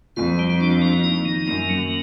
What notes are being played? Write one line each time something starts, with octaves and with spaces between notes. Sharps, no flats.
F2 F4
G3
D4
A#3
D#4
D#3
F#2 A#3
F#3